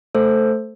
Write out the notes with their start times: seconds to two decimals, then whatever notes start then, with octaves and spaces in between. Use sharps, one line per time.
0.15 A3 A4 C5